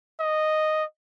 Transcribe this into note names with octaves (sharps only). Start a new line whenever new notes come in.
D#5